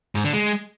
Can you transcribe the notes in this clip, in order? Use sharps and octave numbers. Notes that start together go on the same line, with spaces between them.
G#2
D3
G#3